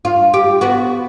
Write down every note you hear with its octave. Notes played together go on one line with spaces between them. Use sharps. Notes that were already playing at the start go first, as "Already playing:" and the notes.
F4
G4
B3 F#4